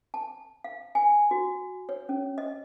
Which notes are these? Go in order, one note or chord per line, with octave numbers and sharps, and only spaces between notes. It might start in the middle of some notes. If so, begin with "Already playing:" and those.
A5
F5
G#5
F#4
C#5
C#4
D#5